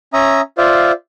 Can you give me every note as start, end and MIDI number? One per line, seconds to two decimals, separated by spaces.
0.13 0.41 61
0.13 0.41 76
0.13 0.41 82
0.13 0.41 87
0.58 0.92 65
0.58 0.92 72
0.58 0.92 74
0.58 0.92 76
0.58 0.92 77